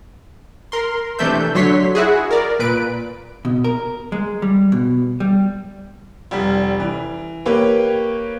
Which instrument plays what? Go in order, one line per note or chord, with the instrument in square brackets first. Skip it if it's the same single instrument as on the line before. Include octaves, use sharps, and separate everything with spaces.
[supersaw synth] A#4 C6
C3 E3 A3 D4 E5 G6
D3 F#3 C#5 C6 B6
E4 F#4 G#4
A#4 D5
A#2 B4 D7
[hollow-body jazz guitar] B2
A#4
G#3
G3
B2
G3
[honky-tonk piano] F1 G3
E3
A#3 G4 B4 C#5 G5